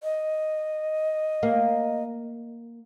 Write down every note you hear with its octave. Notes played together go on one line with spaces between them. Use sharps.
D#5
A#3